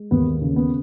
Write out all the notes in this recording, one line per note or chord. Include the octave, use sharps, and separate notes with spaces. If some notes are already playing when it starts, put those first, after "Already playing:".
Already playing: G#3
D#2 B3
C#3
B3